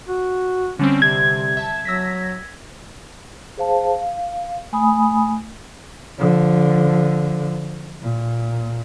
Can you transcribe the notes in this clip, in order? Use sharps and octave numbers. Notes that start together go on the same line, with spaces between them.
F#4
D3 G3 C4 C#4
C3 G#6
E5 A5
F#3 E6 A#6 B6
G#4 C5 F5 A5
F5
A3 G#5 B5 D#6
D3 F3
A#2